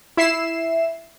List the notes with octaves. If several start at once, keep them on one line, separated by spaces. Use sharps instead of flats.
E4 E5 C7 E7